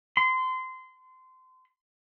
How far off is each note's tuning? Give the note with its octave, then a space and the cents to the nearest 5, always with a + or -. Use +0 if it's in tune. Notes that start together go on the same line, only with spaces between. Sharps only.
C6 -25